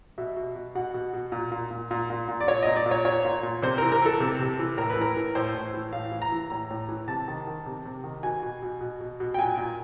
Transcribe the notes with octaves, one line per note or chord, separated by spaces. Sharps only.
B2 E5
B2
B2
B2 F#5
B2
B2
A#2
A#2
A#2
A#2
A#2
A#2
D5
A#2 C#5
A#2 D#5
D5
A#2
C#5
A#2 C#5
A#2
A#2
C3 C5
E3 A#4
A#4
E3 A4
C3
C3
E3
A2 A#4
B4
E3 A#4
E3
A2 C5
A2
E3
A2 F5
E3
A#5
E3
A2 A#5
A2
E3
C3 A5
D#3
D#3
C3
C3
D#3
B2 G#5
B2
B2
B2
B2
B2
G5
A#2 G#5
A#2